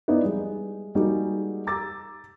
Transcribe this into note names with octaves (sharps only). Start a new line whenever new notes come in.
B3 D#4 E4 D5
G3 G#3
G3 G#3 A#3 D#4 F#4 G#4
A#5 D6 E6 A6